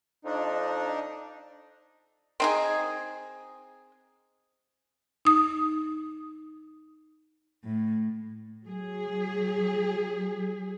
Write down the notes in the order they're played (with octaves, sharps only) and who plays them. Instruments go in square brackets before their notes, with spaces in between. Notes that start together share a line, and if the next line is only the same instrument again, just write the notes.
[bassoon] F2 [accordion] D4 D#4
[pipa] C4 D#4 G#4
[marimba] D#4 D#6
[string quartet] A2
[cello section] F#3 G#4